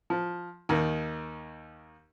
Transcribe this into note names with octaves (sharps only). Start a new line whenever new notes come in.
F3
D#2 D#3